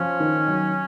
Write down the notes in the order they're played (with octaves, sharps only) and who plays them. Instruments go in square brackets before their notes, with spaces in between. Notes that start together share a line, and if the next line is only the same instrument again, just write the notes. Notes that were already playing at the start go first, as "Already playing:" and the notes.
Already playing: [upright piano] F3 [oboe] C#4
[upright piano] D#3
F#3